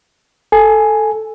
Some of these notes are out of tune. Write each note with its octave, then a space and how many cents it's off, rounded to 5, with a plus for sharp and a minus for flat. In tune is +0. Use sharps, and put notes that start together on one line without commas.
A4 +0 G#5 +0